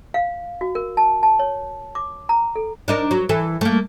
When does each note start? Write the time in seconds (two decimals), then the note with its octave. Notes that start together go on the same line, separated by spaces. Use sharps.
0.14 F5
0.61 F#4
0.75 A#4
0.97 A5
1.23 A5
1.39 C#5
1.95 D6
2.29 A#5
2.55 A4
2.88 D4 D#4 A#4
3.11 F#3
3.29 E3 A4
3.61 A3 A#3